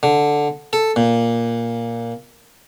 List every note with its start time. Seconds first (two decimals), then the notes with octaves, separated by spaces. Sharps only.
0.03 D3
0.73 A4
0.96 A#2